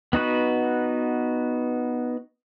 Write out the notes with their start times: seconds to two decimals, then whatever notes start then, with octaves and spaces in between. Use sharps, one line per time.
0.13 B3 D#4 F#4 B4